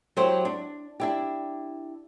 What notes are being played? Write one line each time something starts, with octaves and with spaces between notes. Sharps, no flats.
F#3 E4 G4 C5
D4
D4 E4 G4